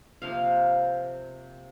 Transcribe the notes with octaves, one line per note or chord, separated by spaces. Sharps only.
C3 F3 A#3 F5